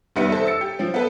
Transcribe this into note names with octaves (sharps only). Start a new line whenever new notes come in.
F1 D#3 G3 B3 E5 C#7
A4 C5 E5
E6 A6 C#7
G4
F3 C4
B3 A4 B4